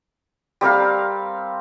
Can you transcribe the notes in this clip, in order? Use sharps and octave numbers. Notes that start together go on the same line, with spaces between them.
G3 C4 A#4 F5